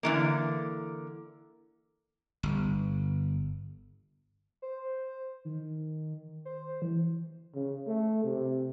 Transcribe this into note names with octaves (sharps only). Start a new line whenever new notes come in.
D3 E3 A#3
G1
C5
D#3
C5
E3
C#3
A3
C3